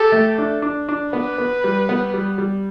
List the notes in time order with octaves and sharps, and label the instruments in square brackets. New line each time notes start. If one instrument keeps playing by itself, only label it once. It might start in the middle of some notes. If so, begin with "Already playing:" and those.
Already playing: [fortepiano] G4 [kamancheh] A4
[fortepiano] A3
D4
D4
D4
[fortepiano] B3 [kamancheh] B4
[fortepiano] B3
G3
B3
G3
G3